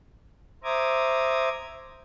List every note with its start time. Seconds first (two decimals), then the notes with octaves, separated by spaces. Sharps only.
0.64 C5 E5 A#5 D6 D#6 G#6